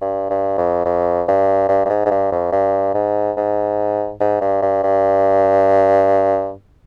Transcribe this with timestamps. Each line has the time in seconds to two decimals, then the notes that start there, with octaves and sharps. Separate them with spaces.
0.01 G2
0.30 G2
0.58 F2
0.85 F2
1.28 G2
1.69 G2
1.86 G2
1.90 G#2
2.06 G#2
2.11 G2
2.32 F2
2.52 G2
2.94 G#2
3.37 G#2
4.20 G#2
4.41 G2
4.62 G2
4.84 G2